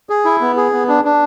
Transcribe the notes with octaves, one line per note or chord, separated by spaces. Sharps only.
G#4
E4
B3
G#4
B3
D4
D4